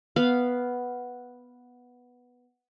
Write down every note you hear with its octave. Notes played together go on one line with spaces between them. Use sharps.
B3 F5